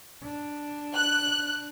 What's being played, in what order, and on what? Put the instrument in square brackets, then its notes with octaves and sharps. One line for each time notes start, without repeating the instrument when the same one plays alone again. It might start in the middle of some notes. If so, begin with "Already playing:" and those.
[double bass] D4
[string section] F#6